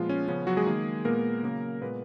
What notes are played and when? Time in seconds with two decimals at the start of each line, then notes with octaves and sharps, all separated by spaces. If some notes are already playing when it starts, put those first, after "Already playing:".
Already playing: A#2 F3 G#3 B3 F4
0.09 C#4
0.28 C#3 F3 B3 C#4
0.47 F#3 F#4
0.57 G#3 G#4
0.66 D#3 A#3
1.05 A#2 G#3 A#3 B3 A#4
1.43 C#3 F#3 A#3
1.81 A#2 G#3 B3 B4